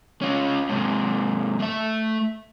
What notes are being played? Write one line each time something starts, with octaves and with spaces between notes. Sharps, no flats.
C#4 F4
G#2 C3
A3 E5